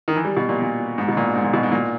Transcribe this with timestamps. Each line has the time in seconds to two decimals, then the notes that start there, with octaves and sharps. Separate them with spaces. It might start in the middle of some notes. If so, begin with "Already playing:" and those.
0.08 D#3
0.17 E3
0.25 G3
0.37 B2
0.49 A#2
0.62 A#2
0.98 G#2
1.08 B2
1.17 A#2
1.35 G#2
1.44 A#2
1.54 B2
1.63 G#2
1.72 A#2